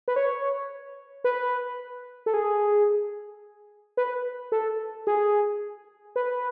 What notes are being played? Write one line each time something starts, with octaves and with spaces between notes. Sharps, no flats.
B4
C#5
B4
A4
G#4
B4
A4
G#4
B4